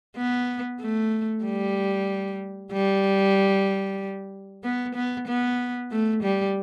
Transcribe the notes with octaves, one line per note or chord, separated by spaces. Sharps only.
B3
A3
G3
G3
B3
B3
B3
A3
G3